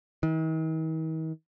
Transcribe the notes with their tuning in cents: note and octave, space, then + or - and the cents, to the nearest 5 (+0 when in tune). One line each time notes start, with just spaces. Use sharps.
D#3 +45